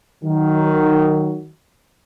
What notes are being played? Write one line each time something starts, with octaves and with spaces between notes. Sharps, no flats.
D#3 F#3